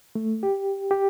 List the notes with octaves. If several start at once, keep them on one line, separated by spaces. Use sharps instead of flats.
A3
G4
G4